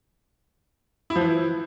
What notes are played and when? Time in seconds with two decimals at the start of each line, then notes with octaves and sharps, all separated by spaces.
1.10 E4
1.16 F3
1.21 E3